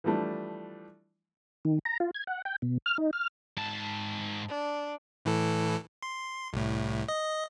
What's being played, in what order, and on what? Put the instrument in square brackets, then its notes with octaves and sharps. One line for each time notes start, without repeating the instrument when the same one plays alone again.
[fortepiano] E3 F3 G3 A3 D4
[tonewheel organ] D#3
A#5
F4
G#6
F#5
G5
B2
F6
D#4
F6
[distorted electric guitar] G#2 A5
[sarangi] D4
[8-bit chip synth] A2 E3 A4
C6
C2 A2
D#5